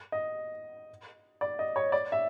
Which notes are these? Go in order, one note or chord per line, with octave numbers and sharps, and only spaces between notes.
D#5
D5
D#5
C#5
D5
E5